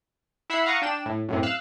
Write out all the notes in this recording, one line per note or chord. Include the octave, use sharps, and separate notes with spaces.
E4 E5 F#5 B5 C7
F5 F#5 A#5 C#6 D#6
D4 G5 E7
A2
F#2 A2 C3
F5 E6 F#6